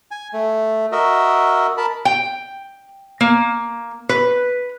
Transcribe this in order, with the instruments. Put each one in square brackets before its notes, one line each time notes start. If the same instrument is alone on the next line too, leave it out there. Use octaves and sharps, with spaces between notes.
[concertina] G#5
A3
F#4 A#4 D#5 E5
A#4 A5 B5
[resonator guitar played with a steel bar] G5
A#3
B4